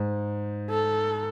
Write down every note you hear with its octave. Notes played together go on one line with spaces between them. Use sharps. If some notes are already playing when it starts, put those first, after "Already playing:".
Already playing: G#2
A4